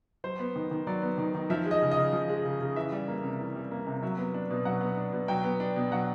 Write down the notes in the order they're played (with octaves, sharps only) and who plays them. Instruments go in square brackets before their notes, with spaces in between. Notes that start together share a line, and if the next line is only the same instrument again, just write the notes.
[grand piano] F#3 C5
B3
D#3
D#3
F#3 D5
B3
D#3
D#3
F3 E5
G#3
D#5
C#3
D#5
C#3
F3
G#3
C#3
C#3
E3 E5
G3
A#3
C3
E3
G3
A#3
C3
F#3 E5
B3
D4
B2
F#3 F#5
B3
D4
B2
F#3 G5
B3
D4
B2
F#3 F#5